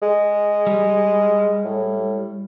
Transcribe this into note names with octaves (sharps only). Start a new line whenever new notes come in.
G#3
G3
A2